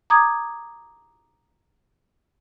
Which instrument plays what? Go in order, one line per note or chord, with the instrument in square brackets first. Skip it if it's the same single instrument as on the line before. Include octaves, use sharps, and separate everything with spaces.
[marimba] A#5 D6 D#6 G#6